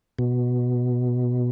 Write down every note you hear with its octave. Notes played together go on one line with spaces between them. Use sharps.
B2